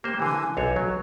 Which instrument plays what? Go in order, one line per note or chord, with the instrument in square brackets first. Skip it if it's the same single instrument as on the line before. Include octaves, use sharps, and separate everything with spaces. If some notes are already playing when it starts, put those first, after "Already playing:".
[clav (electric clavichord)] A#3 C5 [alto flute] G4
[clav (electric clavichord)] D3 E3 [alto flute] G#5
[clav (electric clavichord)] B1 C5 C#5 [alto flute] A4
[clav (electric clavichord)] F#3 [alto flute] F#4